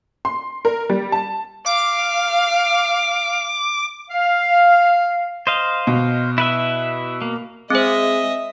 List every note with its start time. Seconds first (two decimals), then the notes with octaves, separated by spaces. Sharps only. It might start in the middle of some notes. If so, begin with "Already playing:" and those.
0.25 C6
0.65 A#4
0.89 G3
1.12 A5
1.66 F5 D6
4.10 F5
5.47 C5 D#5 F5
5.87 B2
6.38 E4 B4 E5
7.22 A#3
7.70 G#3 C4 C5 D#5 E5